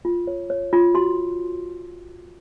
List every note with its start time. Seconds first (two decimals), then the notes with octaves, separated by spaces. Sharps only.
0.05 F4
0.27 C#5
0.50 C#5
0.73 F4
0.95 F#4 C6